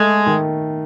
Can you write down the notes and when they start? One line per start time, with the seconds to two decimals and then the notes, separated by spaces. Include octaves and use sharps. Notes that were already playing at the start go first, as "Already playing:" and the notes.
Already playing: G#3 A3
0.26 D#3